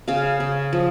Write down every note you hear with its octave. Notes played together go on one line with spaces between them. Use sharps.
C#3 F5
C#3
F3